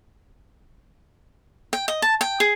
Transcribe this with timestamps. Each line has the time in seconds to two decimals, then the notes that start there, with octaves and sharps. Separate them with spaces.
1.73 G5
1.88 D#5
2.02 A5
2.21 G5
2.40 G#4